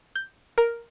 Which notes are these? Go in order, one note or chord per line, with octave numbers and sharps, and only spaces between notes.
G6
A#4